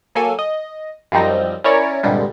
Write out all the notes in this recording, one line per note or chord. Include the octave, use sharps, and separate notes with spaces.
F#3 A#3 A4 G#5
D#5
F#2 F3 G3 C4 D#4 A#6
C#4 E4 A#4 C#5 D5
C2 G2 A#2 D3 G3 G#3